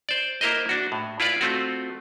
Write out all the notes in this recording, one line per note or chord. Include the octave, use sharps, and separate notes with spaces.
C5 D5
A#3 E4 A#4 C5 D#5
D4 F#4
A2
E4 F4 B4 D5
A3 C4 F4 F#4